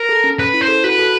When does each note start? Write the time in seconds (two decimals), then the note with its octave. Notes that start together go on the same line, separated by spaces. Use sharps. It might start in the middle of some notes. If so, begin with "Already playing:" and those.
Already playing: A#4
0.09 A4
0.24 C#4
0.39 C#4 B4
0.54 E4
0.61 C5
0.68 A4
0.84 F#4 B4
0.99 A4